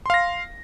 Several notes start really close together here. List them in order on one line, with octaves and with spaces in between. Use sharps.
C6 F5 A#6